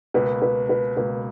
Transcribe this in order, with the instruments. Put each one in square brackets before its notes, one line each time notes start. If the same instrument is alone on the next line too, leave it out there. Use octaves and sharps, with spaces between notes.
[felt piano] C#2 B2 A#3 [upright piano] B4
[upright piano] B4
B4
[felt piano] C#2 B2 A#3 [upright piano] B4